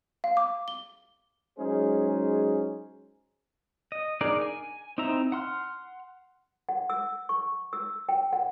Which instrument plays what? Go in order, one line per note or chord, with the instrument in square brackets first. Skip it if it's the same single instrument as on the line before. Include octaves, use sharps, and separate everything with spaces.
[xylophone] F5
D6
G7
[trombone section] F#3 G#3 C#4 D#4 G#4 C5
[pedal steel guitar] D#5
D4 D#4 G#4 A#4 D5
G#5
C4 D#4 E4 E5 A#5
F#5 C6 F6
[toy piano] F#5
E6
C#6
E6
G5
F#5